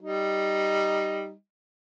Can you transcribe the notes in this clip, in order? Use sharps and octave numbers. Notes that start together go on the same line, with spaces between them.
G3 D#4